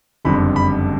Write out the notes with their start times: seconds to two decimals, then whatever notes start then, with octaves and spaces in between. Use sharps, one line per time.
0.25 F#1 F2 D3 G3 B5
0.56 B5